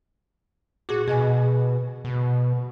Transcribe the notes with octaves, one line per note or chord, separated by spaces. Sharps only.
A#2 F#4 G#4 D6
B2 G#4 D#5 G#5
B2